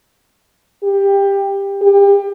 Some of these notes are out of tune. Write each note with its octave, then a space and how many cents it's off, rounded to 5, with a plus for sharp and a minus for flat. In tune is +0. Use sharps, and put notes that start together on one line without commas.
G4 +15
G4 +30